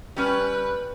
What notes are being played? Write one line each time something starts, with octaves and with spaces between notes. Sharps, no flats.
G3 C#4 B4 G#5